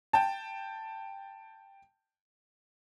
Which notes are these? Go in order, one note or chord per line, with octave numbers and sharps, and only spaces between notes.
G5 A5